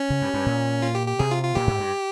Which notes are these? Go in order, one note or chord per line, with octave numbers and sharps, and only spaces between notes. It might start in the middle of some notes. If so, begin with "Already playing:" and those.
Already playing: C#4
C#3
G2
G2
A#2
F4
G4
G4
C3 G#4
F4
F4
A#2 G4
G#2
G2